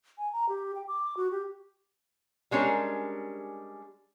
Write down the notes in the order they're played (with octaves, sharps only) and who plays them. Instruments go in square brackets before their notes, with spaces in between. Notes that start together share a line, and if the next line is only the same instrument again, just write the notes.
[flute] G#5
A#5
G4
G5
D6
F#4
G4
[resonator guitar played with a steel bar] G3 G#3 C#4 D4 G4 A#4